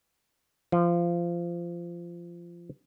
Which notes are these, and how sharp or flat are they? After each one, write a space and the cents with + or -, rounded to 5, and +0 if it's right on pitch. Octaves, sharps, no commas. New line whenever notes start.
F3 -20